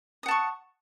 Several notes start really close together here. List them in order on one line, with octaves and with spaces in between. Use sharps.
D#6 F#5 A5 C#6